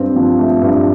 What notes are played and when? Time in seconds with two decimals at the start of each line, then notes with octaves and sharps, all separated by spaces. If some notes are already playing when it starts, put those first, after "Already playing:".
Already playing: G2 C4
0.16 F3
0.39 A3
0.61 G2